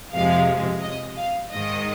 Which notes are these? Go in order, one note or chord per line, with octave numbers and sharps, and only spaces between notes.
F2 C3 F3 G#3 F5
D#5
F5
G#2 D#3 G#3 D#5